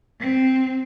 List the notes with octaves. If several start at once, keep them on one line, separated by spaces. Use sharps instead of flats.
C4